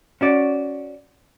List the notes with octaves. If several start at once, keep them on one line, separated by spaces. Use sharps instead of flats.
C#4 F#4 D5